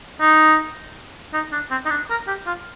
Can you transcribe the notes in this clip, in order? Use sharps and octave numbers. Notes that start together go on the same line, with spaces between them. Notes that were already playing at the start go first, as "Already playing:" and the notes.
D#4
D#4
D4
C4
D#4
D4
A#4
G4
F4